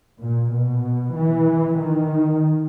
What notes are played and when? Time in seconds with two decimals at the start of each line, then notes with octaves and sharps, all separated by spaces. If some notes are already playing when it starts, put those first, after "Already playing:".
0.22 A#2
0.54 B2
1.16 E3
1.79 D#3